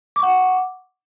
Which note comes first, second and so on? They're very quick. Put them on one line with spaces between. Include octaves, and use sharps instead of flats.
D6 C#6 F#5